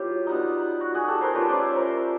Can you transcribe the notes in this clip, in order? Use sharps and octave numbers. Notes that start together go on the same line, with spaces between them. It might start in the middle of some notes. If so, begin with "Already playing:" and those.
Already playing: F#3 B3 E4 F4 G4
G3 B3 D#4
F#4
F#4 G#4
G4 A4
A#4 C5
A3 C#4 F4 B4 C#5
C5 D5
D5 E5
A#4 C5